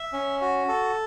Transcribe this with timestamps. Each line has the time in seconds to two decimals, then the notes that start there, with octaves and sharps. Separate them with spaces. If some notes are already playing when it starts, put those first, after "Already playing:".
Already playing: E5
0.13 C#4
0.41 F#4
0.68 A4